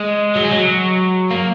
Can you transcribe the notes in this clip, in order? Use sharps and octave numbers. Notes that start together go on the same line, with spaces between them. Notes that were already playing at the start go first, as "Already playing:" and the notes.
Already playing: G#3
F#3
G#3
F#3
A#3